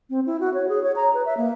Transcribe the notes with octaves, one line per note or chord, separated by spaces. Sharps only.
C4
E4
F#4
C#5
G#4
C#5
A#5
B4
E5
A#3